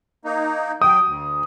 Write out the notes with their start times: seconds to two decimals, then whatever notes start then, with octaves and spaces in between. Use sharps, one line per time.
0.25 A#3 D#4
0.82 F#3 G5 D#6
1.06 D2